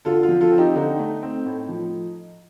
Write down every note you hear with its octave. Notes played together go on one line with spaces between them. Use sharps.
D3 F4 A4
F4
F3
F4 A4
C4
D#4 G4
D3 D#4
A3
C4
A2
F3